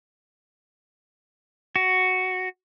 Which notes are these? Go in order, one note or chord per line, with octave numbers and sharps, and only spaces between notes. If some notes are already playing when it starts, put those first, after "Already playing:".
F#4